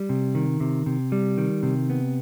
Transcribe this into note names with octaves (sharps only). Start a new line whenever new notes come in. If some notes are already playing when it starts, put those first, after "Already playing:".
Already playing: G3
C3
D#3
C3
C3
G3
D#3
C3
B3